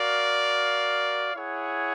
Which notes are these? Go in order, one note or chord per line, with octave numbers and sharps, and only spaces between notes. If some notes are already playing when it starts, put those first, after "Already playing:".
Already playing: F#4 A#4 D5 F5
E4 G#4 C#5 F#5